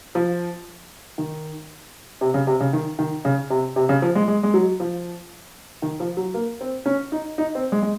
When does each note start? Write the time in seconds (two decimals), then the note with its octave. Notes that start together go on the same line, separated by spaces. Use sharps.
0.15 F3
1.18 D#3
2.21 C3
2.34 C#3
2.47 C3
2.60 C#3
2.73 D#3
2.99 D#3
3.25 C#3
3.50 C3
3.76 C3
3.89 C#3
4.02 F3
4.15 G#3
4.28 G#3
4.43 G#3
4.54 F#3
4.80 F3
5.82 D#3
6.00 F3
6.17 F#3
6.34 A#3
6.61 C4
6.86 C#4
7.12 D#4
7.38 D#4
7.55 C4
7.72 G#3
7.82 G#3